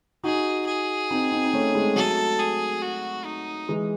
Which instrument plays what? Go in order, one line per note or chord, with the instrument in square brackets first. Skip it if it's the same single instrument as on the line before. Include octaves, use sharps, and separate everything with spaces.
[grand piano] D#4 F#4 [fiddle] G#4
[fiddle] G#4
[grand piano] C4 D#4
C4 D#4
D#4
A3 C#4
G#3 C4
[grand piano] F#3 A3 [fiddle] A4
[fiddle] G#4
F#4
D#4
[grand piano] E3 G#3